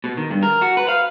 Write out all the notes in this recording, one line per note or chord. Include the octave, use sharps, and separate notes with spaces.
B2
D#3
G2
A#4
F#4
B4
F5